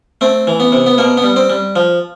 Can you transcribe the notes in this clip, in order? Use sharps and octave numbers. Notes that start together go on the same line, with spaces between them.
A3 C4
E3
B3
C3
B3
B2 A#3
B3
G3
C4
G3
F3